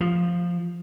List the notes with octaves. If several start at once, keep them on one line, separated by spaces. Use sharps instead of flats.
F3